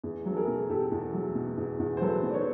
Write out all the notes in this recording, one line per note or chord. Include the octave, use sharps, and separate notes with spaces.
E2
F#3
A4
G#4 A#4
B2
E2 G4 A4
E2
F#3
B2
E2
E2
C5
F#3 A4 B4
B2
D5
B4 C#5